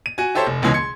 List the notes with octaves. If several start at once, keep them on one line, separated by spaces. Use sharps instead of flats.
D#7
F#4 G#5
E4 G4 A4 C5 C#5 E5
F1
F#1 C#2 B2 E3 G#3 C#4
C6 G#6 C#7